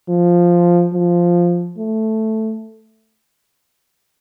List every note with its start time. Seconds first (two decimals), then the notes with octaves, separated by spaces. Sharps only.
0.09 F3
0.94 F3
1.78 A3